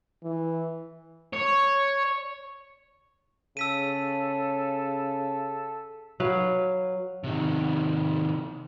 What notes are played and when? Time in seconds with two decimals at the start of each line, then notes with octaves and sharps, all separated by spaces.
0.23 E3
1.33 C#5
3.57 C#3 A4 E6 B6 D#7
6.20 F#3 B4 F5
7.24 C3 D#3